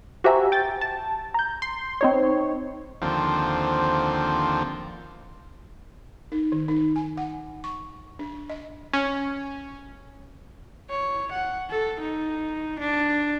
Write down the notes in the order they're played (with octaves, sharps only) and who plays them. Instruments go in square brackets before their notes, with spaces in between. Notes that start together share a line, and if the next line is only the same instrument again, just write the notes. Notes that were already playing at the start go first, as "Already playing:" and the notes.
[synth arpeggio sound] F#4 G4 C5 E5 G#5 A#5
G5 A6
A5
A#5 G6
C6
C4 D#4 C#5
[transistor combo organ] D#2 D3 F3 C4
[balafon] D#4
D#3
D#4
G#5
F#5
C#6
D4
D#5
[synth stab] C#4
[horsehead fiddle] C#5
F#5
A4
D#4
D4